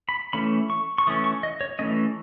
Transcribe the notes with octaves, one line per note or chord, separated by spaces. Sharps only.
B5
E3 A3 C#4 B5
C#6
C#6
E3 A3 C#4 D#6
C#6
D#5
C#5
E3 A3 C#4 D#5